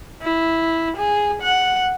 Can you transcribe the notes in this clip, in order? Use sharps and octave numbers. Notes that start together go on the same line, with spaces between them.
E4
G#4
F#5